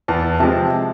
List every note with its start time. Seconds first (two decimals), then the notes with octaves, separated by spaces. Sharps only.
0.08 E2 A5
0.40 C3 F3 G#3 A5